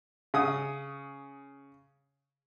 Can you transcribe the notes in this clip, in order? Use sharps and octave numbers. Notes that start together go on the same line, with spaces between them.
C#3 D#6